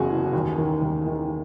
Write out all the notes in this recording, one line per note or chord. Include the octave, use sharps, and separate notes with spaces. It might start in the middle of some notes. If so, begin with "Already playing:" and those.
Already playing: F#1 E2 C#3 F#4 G#4
E3
D#2
D#3
D#2
D#3